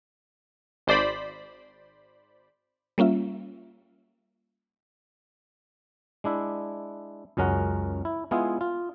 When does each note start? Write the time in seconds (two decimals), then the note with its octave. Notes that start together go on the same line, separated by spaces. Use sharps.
0.87 G#1 C5 D5 B5
2.98 G3 A#3 C#4 F4 E5
6.24 G#3 D4 E4 E5
7.37 C#2 F#2 G#3 C#4 A#4 F#5
8.05 E4
8.31 G#3 B3 E4 F4 G#4
8.61 F4